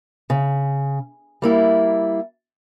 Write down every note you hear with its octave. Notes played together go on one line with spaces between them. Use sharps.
C#3
G3 A#3 E4